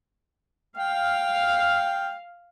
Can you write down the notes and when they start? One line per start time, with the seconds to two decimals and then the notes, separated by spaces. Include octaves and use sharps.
0.77 F5 G5